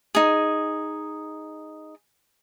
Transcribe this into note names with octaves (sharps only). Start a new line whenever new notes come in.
D#4 G#4